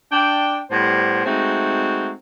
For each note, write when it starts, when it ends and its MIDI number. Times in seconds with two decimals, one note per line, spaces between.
0.12 0.60 62
0.12 0.60 79
0.71 1.23 45
0.71 1.23 55
0.71 1.23 59
0.71 1.23 72
1.26 2.12 56
1.26 2.12 57
1.26 2.12 60
1.26 2.12 63
1.26 2.12 66